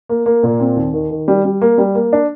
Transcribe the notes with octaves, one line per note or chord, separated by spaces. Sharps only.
A#3
A#3
A#2
C4
D#2
D#3
D#3
G3
G3
A#3
G3
A#3
D4